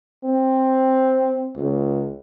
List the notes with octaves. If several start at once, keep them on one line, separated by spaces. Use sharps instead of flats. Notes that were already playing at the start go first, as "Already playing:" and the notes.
C4
C#2